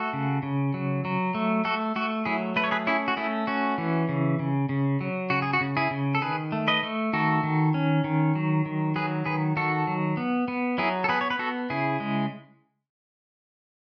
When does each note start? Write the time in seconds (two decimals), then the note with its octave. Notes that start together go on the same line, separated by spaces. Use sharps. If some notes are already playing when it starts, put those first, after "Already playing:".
Already playing: A3 F#4 A4
0.13 C#3
0.43 C#3
0.74 F#3
1.05 F#3
1.35 A3
1.65 A3 F#4 A4
1.96 A3 F#4
2.25 F#3 E4 G#4
2.56 A3 B4
2.64 C#5
2.71 G#4 B4
2.87 C#4 E4 G#4
3.08 F#4
3.17 A3 E4 G#4
3.47 C#4 F#4
3.78 E3
4.09 C#3
4.39 C#3
4.69 C#3
5.01 F#3
5.30 C#3 F#4
5.42 G#4
5.53 F#4
5.61 C#3
5.77 E4 G#4
5.91 C#3
6.15 A4
6.21 D#3 G#4 B4
6.52 A3
6.68 B4 D#5
6.83 A3
7.13 D#3 F#4 A4
7.43 D#3
7.74 C#4
8.04 D#3
8.35 F#3
8.66 D#3
8.96 F#3 G#4 B4
9.26 D#3 G#4 B4
9.57 D#3 F#4 A4
9.87 F#3
10.17 B3
10.48 B3
10.78 F#3 E4 G#4
11.04 A4
11.09 B3 G#4 B4
11.21 C#5
11.30 B4
11.39 B3 F#4 A4
11.70 C#3 E4 G#4
12.00 G#3